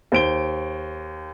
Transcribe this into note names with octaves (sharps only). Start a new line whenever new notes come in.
D#2 C5 D7 G7